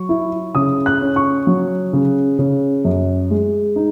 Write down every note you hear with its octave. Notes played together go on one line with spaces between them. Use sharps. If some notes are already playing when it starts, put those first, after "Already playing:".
Already playing: F#3 C#6
E4
C#3 D#6
F#6
C#4
C#6
F#3
C#3
C#3
F#2
G#3
D#4